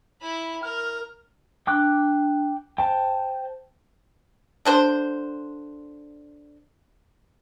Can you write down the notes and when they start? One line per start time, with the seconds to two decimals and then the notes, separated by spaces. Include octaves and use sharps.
0.22 E4 B5
0.63 A#4 F6
1.67 D4 G5 D6 F#6
2.78 C5 G5 A5
4.65 D3 D4 C5